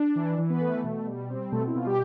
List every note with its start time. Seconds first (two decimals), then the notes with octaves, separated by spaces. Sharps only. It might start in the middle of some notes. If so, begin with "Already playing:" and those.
Already playing: D4
0.16 E3
0.38 E3
0.50 B3 B4
0.61 A3
0.84 B2
1.07 G3
1.30 C4
1.52 B2 A3 A4
1.68 E4
1.75 B2 F4
1.86 G3 G4